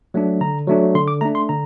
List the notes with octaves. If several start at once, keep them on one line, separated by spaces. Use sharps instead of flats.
F#3 A3 D4
D3 A#5
F#3 A3 D4
D3 C6
D6
A3 D4 A#5
C6
D3 A#5